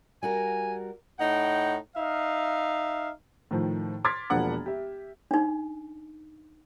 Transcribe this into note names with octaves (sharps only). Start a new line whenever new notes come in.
G3 F#4 A#4 G#5
A2 D#4 F#5 G5
D#4 E5 F5
A2 D#3 F3
C6 D6 F6 G#6 A6 B6
E1 F3 A#3 D4 F#5 D6
G4 E5
D4 D#4